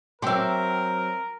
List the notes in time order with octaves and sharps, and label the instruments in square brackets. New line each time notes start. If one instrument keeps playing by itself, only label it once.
[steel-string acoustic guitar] F#3 C4 [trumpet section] A#4 [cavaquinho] E5 C6 [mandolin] G5 D6